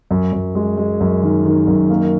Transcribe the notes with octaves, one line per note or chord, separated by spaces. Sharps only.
F#2
F#2
G#3
G#3
F#2
D#3
D#3
F#2
A#3